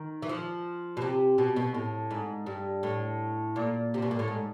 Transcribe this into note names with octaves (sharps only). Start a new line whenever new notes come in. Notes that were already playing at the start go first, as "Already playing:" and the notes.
Already playing: D#3
E3
F3
B2
C3
B2
B2
A2
G#2
G2
A2
A#2
C3
B2
A#2
A2
G#2